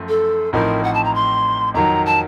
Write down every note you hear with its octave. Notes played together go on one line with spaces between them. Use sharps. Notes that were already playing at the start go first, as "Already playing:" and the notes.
Already playing: F#2 F3 A3
A4
A1 A2 F3 C4 D#4 A#4
F#5
A5
A#5
C6
F2 D#3 F#3 A#5
A5